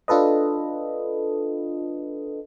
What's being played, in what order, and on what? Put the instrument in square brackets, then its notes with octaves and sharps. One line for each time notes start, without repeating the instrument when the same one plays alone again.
[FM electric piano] D4 F4 A4 B4 D#5